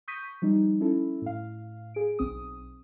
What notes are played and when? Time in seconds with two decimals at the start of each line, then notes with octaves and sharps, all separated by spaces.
0.08 C#6 D#6 G6 A#6 B6 D#7
0.42 F3 G3 D#4
0.80 C#4 E4 A4
1.22 A2 F5
1.94 G#4 D7
2.19 B1 C4 D#6